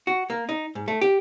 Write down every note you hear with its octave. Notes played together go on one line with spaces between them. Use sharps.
F#4
A#3
D#4
G#2
A3
G4